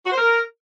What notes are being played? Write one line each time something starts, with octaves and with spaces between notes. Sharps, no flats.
F#4
C5
A#4